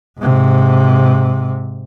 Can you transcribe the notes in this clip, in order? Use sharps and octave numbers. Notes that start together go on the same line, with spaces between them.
G#2 C3